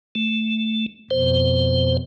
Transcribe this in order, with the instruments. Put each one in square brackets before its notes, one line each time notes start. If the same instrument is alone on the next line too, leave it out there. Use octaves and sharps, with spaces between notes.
[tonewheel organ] A3
[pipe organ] F2 B2 [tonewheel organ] C5